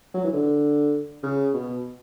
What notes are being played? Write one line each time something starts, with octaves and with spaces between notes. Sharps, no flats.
F#3
E3
D3
C#3
B2